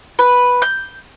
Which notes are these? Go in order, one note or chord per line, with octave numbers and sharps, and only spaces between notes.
B4
G6